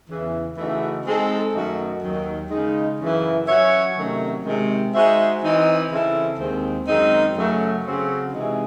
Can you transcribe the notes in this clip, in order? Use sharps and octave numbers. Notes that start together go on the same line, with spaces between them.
E2 C#3 E3
C#3 E3 A3 D#4 F#4
G#3 C4 D#4 A4
F#2 D#3 A3 D#4 F#4
D#2 D#3 F#3
C#3 G#3 D#4
F#2 C#3 E3
F#3 C#4 F#4 C#5 E5
C3 D#3 F#3 A3 C#4
C3 D#3 G#3
G#3 D#4 F#4 C5 E5
E3 C4 D#4
C#3 E3 C4 E4 A4
D#2 D#3 G#3 C4
F#2 D#3 G#3 C4 D#4
F#2 C#3 F#3 A3
C#3 F#3 C4 F#4
C3 E3 G#3 D#4 G#4